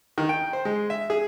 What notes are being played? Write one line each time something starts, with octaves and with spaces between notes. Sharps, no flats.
D#3
G5
C5
G#3
E5
G#4